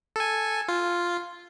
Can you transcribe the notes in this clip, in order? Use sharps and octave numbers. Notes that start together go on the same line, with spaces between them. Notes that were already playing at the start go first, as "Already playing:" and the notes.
A4 G#5
F4